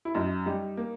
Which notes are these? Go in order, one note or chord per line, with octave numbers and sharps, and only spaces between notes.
E4
F#2 D#4
G3 D#4
A#3